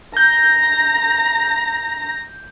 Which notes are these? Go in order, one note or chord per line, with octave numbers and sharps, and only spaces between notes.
A#5 G6